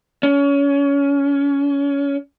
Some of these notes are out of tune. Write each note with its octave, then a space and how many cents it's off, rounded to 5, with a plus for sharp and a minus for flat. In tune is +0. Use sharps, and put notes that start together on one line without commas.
C#4 +25